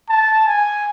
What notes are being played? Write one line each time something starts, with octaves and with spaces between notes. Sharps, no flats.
A5
G#5